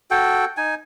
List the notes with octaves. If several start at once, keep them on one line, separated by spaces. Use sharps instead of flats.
F#4 A4 G5
D#4 G#5